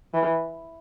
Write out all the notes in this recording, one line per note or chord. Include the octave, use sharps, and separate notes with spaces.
E3